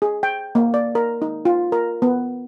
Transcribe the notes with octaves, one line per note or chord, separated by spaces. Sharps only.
G#4
G5
A#3
D5
A#4
D#4
F4
A#4
B3